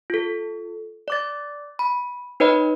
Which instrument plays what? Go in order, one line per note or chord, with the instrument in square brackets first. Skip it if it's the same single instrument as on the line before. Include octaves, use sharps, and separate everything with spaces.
[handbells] F4 A4
D5 D6 A6
B5
D#4 B4 C#5 D#5 B5